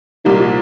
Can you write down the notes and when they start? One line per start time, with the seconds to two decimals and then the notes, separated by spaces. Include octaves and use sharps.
0.24 C2 A#2 D#3 G3 A#3
0.39 F3